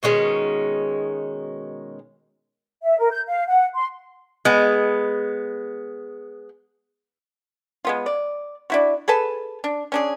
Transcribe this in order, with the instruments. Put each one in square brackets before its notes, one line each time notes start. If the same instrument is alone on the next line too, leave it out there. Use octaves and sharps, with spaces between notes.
[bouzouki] B2 D#3 G#3 C#4
[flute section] E5
A#4
G6
F5
F#5
C6
[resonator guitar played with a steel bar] G#3 B3
[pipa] G#3 B3 F4
D5
D4 E4 F#4
G#4 A4 B4 A5
D4
C#4 D4 G#4